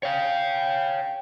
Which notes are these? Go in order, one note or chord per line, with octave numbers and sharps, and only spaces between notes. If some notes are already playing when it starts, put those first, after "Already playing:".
C#5 F5 G5